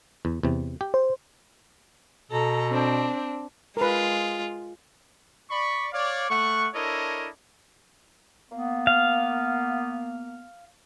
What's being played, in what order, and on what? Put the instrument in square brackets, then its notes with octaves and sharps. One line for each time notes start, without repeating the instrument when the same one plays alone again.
[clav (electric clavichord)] E2
E2 C3
G4
[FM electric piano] C5
[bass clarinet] B2 [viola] A4 A#5
[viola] C4 D4
[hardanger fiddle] G#3 F4 [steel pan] A#4 B4
[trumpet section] D5 B5 C#6
C#5 D5 F5
A3 F#5 C#6
D4 E4 A4 A#4 C#5 D#5
[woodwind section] A#3 B3
[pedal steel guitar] F5